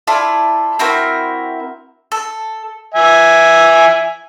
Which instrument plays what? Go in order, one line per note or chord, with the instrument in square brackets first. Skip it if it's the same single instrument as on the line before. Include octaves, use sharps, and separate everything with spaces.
[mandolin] E4 F4 A4 D5
C4 E4 F#4 A#4
A4
[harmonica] E5 G#5